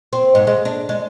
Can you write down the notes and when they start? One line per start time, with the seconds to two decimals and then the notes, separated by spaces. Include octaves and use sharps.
0.13 C4
0.35 G#2
0.47 G#3
0.65 D4
0.89 G#3